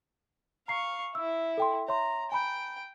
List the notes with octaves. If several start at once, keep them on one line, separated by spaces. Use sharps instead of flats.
F5 A#5 C#6 C7
E4 E6
A4 G5 C6
C#5 E5 A#5 C6
G5 G#5 A#5 B5